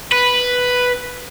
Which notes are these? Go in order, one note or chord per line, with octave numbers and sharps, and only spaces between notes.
B4